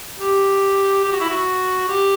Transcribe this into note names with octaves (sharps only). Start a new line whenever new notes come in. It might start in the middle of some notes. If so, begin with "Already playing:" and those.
G4
G4
F#4
E4
F#4
G4